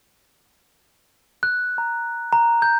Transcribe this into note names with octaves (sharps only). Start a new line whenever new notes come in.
F#6
A#5
A#5
G6